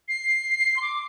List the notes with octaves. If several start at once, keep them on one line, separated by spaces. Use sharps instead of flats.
C7
C6
D6